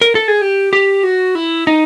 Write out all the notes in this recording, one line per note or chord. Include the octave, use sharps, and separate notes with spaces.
A#4
A4
G#4
G4
G4
F#4
E4
D#4